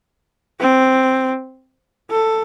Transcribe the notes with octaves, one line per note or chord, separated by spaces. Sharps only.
C4
A4